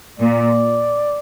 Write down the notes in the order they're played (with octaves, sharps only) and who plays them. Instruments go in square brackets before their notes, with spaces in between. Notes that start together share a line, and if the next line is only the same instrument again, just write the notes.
[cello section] A#2 [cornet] D5